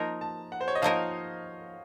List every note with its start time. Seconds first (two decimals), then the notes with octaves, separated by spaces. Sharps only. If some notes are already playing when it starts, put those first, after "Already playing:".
Already playing: F3 A#3 D#4 A#4 A#5
0.21 A5
0.52 F#5
0.61 C5
0.68 C#5
0.75 D#5
0.82 F3 A#3 D#4 A#4 F5